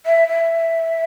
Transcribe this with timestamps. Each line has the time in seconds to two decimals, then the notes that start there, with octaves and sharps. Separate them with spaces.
0.06 E5
0.28 E5